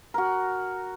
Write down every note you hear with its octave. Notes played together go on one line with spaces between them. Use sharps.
F#4 A#4